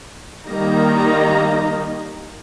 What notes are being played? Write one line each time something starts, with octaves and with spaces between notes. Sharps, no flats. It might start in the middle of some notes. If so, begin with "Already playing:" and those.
D#3 G3 A#3 D#4 A#5